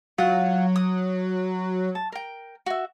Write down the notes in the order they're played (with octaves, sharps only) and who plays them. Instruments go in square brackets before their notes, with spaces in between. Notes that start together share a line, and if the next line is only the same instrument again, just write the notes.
[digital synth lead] F#3 [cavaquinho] F4 F#5
[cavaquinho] D#6
A5
A#4 G5
F#4 E5